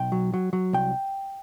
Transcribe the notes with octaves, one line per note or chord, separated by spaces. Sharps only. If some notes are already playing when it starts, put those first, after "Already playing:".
Already playing: B1 G5
F#3
F#3
F#3
C2 G5